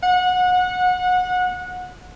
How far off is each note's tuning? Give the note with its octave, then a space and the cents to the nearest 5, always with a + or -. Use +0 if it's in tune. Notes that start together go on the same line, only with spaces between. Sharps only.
F#5 -25